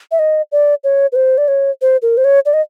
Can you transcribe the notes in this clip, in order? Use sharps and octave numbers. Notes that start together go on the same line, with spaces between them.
E5
D#5
D5
C#5
B4
C5
D5
C#5
C5
A#4
C5
C#5
D5
D#5